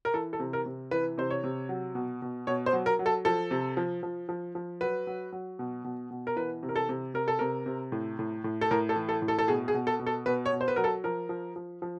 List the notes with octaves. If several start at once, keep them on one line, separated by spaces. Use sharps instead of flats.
A#4
E3 A4
A4
C3
A#4
C3
E3 B4
C3 C5
C#5
C3
F#3
B2
B2
B2 C#5
C5
F#3
A#4
F#3
A4
F3 A4
C3
F3
F3
F3
F3
F#3 B4
F#3
F#3
B2
B2
B2
A#4
E3 B4
C3
A#4
A4
C3
C3 A#4
A4
C3 A#4
C3
A2
A2
A2
A4
A2 A#4
A4
E3
A4
A2
A4
A4
B2 G#4
G#4
B2
A4
B2
A4
B2 B4
C#5
B2
C5
B4
F#3 A#4
A4
F3 A#4
F3
F3
F3